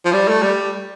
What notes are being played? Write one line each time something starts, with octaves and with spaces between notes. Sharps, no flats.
F3
G3
A3
G3